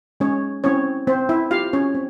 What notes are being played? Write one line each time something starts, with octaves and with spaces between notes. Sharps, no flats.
G#3 C#4 C#5
C4 C#4 E4 C#5
C4 C5
E4 E5
F4 G4 F5
C#4 C#5
C4